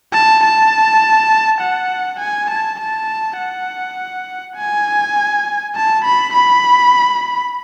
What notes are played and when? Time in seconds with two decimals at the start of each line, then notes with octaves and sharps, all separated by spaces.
0.13 A5
0.43 A5
1.61 F#5
2.19 G#5
2.50 A5
2.79 A5
3.38 F#5
4.56 G#5
5.75 A5
6.04 B5
6.33 B5